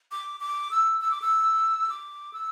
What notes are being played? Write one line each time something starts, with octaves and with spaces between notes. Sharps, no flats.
D6
D6
E6
E6
D6
E6
D6
E6